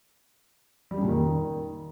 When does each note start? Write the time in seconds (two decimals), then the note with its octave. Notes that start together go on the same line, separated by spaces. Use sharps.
0.91 G3
0.97 C#3
1.03 A#2
1.08 D#3